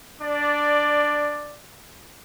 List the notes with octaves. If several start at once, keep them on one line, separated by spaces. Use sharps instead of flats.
D4 D5